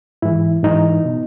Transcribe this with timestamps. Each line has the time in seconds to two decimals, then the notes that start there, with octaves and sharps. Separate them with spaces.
0.22 G#2 E3 E4
0.63 G#2 E3 D#4
1.05 B2